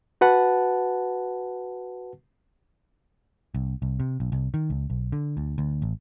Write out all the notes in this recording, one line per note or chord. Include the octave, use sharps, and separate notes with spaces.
F#4 B4 F#5 A5
C2
C2
C3
B1
C2
D#3
C#2
B1
D3
D2
D2
A1